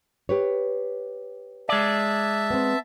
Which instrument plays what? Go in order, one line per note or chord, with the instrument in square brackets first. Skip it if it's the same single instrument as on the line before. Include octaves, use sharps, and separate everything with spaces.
[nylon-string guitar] G4 B4 C#5
[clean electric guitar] G#3 D5 [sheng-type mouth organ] E5 A5
[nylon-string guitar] B3 C4